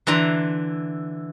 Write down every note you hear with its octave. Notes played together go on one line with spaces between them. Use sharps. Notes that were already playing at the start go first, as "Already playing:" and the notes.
D3 E3 A#5 C6